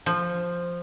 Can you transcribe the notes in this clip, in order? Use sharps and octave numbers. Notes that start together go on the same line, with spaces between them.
F3